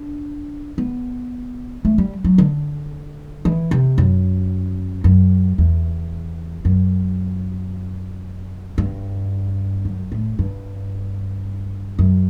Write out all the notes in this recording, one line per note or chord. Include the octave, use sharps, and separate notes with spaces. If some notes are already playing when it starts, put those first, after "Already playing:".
Already playing: D4
B3
A3
G3
F#3
D3
E3
C3
F#2
F#2
E2
F#2
G2
F#2
A2
G2
F#2